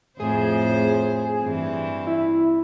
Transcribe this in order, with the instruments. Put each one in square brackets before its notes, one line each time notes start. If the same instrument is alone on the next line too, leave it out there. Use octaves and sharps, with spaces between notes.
[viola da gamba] F2 A2 C5 [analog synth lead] G#4
[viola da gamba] G2 E3 C4
[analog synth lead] E4